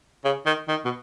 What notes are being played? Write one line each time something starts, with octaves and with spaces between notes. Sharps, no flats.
C#3
D#3
D#3
B2